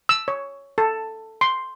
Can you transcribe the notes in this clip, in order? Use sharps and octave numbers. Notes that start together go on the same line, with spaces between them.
E6
C#5
A4
C6